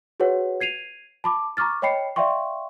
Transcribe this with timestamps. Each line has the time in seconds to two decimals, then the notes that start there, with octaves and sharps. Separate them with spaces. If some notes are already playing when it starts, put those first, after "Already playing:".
0.20 F#4 G#4 B4 C#5 F#5
0.61 G#6 C7 D#7 F7
1.24 A5 B5 D6
1.57 A#5 C#6 D6 F6 A6
1.82 C#5 D#5 G5 B5 C7 C#7
2.16 D5 E5 F5 G5 C6 C#6